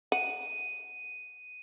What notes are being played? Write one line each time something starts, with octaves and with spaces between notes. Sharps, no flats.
F#5 D#7